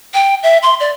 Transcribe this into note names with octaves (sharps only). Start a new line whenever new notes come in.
G5
E5
C6
D5